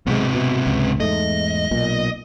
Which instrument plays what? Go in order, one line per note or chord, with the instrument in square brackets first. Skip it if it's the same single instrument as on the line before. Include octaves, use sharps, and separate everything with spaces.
[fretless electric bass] B1 G#3 [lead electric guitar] G#2 C3
[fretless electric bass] B2
C#2
[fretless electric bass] E2 G#2 A3 [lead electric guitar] D#5
[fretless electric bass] B1 A#2